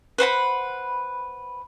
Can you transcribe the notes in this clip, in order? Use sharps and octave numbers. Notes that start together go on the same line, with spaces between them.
B4 C5 F#5 B5